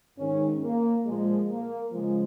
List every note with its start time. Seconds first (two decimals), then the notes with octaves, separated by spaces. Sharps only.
0.19 G#2 D#3 C#4
0.63 A#3
1.06 A#2 F3 G#3
1.50 A#3
1.93 C#3 F3 G#3